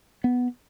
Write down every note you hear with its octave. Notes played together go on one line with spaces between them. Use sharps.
B3